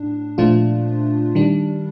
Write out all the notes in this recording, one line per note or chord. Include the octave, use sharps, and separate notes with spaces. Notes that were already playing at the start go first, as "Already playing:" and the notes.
Already playing: A2 D4
A#2 F3 A3 D4 F4
D#3 G3 D4